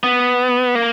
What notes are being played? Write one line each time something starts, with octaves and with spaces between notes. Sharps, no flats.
B3
A#3